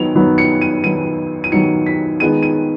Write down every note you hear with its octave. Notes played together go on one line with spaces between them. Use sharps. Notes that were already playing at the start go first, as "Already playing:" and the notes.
Already playing: D#3 F#3 B3 F7
D#3 F#3 B3
C#7
D#7
D#3 F#3 B3 D#7
D#7
D#3 F#3 B3 C#7
B6
D#3 G#3 B3 D#7
D#7